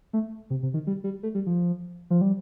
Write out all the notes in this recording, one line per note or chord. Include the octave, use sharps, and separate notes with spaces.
A3
C3
C3
D#3
G3
G3
A3
G3
F3
F3
G3